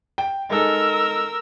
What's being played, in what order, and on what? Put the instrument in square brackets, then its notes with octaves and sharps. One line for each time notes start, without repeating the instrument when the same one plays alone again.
[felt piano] G5
[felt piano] G#3 D#4 A4 [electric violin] A#4 E6